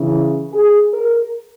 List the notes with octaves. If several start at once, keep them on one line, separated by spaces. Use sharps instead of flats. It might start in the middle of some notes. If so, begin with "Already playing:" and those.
Already playing: C#3 E3
G#4
A#4